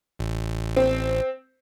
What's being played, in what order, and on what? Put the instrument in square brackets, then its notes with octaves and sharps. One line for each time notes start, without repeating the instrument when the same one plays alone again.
[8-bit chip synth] A1
[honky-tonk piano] C4